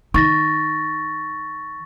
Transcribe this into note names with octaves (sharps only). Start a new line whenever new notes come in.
D#3 C#6 A6 A#6